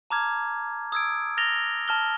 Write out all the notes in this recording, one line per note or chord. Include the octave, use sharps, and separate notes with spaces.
A5 A#5 D6 F6 G#6
D#6 E6 G#6 D7
F6 A6 A#6 F7 G7
A5 F6 G7